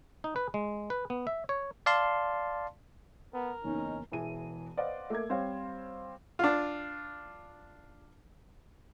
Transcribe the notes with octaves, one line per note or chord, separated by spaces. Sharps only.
D#4
B4
G#3
B4
B3
E5
C#5
D5 F5 A5 C6
B3 A#4
F#1 E2 C#4 D#4
E1 E3 G#4 D#7
B4 C5 D5 D#5 F5 F#5
A3 A#3 D6 G#6
G3 C4 C5 C#5 F5
D4 F4